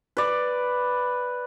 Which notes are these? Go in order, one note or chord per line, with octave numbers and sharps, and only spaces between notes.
B4 D5